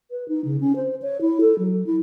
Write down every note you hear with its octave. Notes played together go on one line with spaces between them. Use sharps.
B4
D#4
C#3
C#4
C5
C#5
E4
A4
F#3
E4